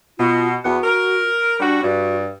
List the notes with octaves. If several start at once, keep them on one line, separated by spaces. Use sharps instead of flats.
B2 F4
E2 B3 F#4 F#5
A#4
G3 D4 F#4
G2 F#4